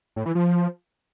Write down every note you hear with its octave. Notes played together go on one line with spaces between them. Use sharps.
A2
E3
F3